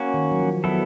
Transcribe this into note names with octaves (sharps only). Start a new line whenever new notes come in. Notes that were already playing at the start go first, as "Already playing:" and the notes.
Already playing: A#3 C#4 F#4
D#3
F#3
F3
F#3 B3 E4 A4